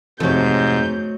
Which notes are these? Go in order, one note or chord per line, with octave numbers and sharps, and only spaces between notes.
F2 G#2 C3 F#3 A3 G6